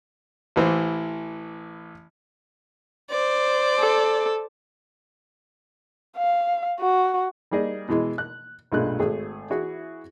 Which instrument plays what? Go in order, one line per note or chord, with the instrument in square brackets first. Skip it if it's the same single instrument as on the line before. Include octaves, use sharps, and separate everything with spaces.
[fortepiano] A1 E3 C5
[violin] C5 D5
[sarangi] A4
[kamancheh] F5
F#4
[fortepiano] G3 A#3 D#4 G#4 D5 D#5
B2 E3 G#3
F#6
B1 G2 A#2 G#3 A3 F#6
G#1 A3 G#4
E3 E4 F#4 G#4